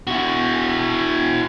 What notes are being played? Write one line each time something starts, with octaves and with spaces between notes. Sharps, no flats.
E4 F#4